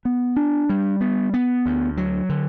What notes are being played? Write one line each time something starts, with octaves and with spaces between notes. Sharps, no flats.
B3
D4
G3
B3
B3
D2
F#3
D3